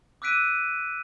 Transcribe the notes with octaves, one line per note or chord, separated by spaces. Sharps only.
D6 E6 F#6 B6 D7 D#7